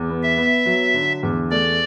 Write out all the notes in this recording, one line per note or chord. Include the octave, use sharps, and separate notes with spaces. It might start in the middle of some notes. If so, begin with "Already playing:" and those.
Already playing: E2
B3
E5
B3
F#3
D3
E2
A3 D5